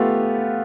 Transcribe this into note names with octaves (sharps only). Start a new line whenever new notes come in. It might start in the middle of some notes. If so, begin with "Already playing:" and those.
Already playing: A3 B3 F4 G4